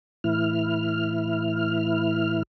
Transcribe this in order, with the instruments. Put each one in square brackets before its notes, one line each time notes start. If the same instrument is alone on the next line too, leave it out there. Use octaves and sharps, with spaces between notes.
[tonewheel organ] A2 E3 E4 F6